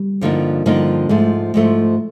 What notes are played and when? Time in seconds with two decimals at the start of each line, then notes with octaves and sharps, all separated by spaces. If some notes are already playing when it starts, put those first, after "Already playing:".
Already playing: G3
0.21 G2 D3 F3 A#3 D#4
0.66 G2 D3 F3 A#3 D#4
1.09 G#2 F3 G#3 A3
1.54 G#2 F3 A3